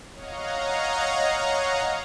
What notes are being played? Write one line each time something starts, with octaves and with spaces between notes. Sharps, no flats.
C#5 D#5 F5 F#5 A#5